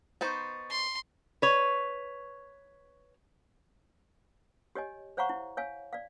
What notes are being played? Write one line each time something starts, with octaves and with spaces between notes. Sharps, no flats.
B3 D#4 C5 C#6 G6 A6
C6
B4 C#5
G4 C#5 D#5 G#5
C5 C#5 F5 F#5 A#5 C#6
E4
C#5 F5 G#5
D5 F5